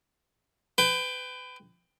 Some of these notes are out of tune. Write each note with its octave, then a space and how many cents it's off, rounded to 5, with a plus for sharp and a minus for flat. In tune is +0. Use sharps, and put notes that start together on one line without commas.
B4 +30 G5 +15